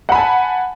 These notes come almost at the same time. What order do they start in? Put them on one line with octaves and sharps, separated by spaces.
F#5 B5 G#5 A5